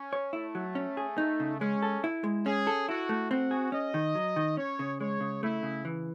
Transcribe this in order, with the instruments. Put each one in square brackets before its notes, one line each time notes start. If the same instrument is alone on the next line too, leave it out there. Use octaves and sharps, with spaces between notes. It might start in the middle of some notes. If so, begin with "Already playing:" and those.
Already playing: [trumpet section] C#4
[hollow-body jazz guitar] C#5
[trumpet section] A3 [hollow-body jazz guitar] E4
[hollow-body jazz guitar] F#3
C#4
G#4
[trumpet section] A3 [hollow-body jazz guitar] D#4
[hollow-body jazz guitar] C#3
[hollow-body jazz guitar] G#3 [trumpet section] C#4
[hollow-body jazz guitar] A4
E4
G#3
[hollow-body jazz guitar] C#4 [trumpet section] G#4
[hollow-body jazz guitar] A4
[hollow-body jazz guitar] E4 [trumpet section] F#4
[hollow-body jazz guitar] A3
[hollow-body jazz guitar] C4 [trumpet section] F#4
[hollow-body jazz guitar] G#4
[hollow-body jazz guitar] C#4 [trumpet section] D#5
[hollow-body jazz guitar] D#3
F#3
D#3
[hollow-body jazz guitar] C#4 [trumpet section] C#5
[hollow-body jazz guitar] C#3
[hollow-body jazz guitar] G#3 [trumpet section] C#5
[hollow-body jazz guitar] C#3
[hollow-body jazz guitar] A3 [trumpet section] E4
[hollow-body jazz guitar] C#3
E3